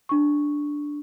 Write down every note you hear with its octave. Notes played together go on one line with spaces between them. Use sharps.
D4 C#6